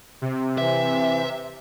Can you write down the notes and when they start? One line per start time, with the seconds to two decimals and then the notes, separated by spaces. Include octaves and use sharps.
0.22 C3
0.58 E3 E5